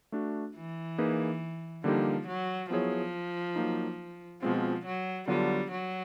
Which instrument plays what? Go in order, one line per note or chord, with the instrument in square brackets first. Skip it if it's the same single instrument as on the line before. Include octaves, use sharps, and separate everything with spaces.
[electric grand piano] A3 D4 F#4
[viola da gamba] E3
[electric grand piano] A#3 D#4 G#4 B4
[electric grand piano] D3 G3 A#3 D#4 G4 [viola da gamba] F3
[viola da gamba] F#3
[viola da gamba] F3 [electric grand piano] F#3 B3 E4 G#4 C#5
[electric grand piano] F#3 A#3 D#4
[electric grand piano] B2 G#3 C4 F4 [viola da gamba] F3
[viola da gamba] F#3
[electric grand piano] D3 F#3 B3 D4 F4 [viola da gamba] G3
[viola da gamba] F#3